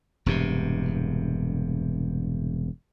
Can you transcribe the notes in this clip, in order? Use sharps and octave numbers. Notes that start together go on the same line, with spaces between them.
E1 G2 C3